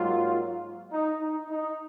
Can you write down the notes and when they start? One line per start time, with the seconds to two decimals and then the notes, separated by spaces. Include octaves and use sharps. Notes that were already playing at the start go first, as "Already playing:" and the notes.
Already playing: G#2 F#3 A#3 F4
0.91 D#4
1.20 D#4
1.49 D#4